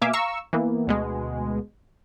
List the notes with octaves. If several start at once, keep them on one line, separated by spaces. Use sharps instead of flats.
B2 A#3 E5 F5 G#5 D6
F5 A#5 C#6 E6
E3 A#3 B3
D2 B2 G#3